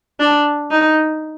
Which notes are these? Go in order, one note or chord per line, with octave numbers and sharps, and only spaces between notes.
D4
D#4